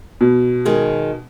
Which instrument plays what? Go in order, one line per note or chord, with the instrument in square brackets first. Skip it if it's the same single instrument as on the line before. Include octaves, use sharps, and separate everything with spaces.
[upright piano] B2
[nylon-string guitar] D#3 G#3 G#4